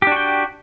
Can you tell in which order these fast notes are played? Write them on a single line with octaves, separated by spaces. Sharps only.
G4 D4 F#4 G5